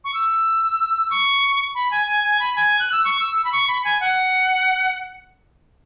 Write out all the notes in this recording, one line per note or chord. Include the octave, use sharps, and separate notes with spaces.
C#6
E6
C#6
B5
G#5
G#5
G#5
B5
G#5
F#6
E6
C#6
E6
E6
B5
C#6
B5
G#5
F#5